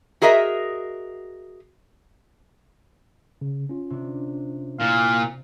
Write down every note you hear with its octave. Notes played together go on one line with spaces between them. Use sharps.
F#4 G#4 A#4 D#5 E5
C#3
C#4 F4
C3 D4
A#2 E4 F5